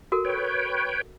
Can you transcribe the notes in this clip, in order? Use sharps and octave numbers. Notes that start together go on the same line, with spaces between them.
F#4 A4 A#4
B4 C#5 G5